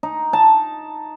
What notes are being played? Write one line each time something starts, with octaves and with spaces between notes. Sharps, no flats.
D#4
A5